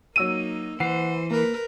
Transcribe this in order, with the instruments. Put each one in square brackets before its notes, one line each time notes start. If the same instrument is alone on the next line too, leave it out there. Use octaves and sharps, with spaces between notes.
[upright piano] F#3 E6 D#7 [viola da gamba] A#3 D#4
[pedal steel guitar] E3 [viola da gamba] C5 [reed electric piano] F#5 [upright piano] C7
[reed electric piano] A#3 [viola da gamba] A#4 B4